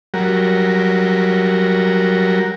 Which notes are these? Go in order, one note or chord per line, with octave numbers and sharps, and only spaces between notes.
F#3 G3 F#4 A#4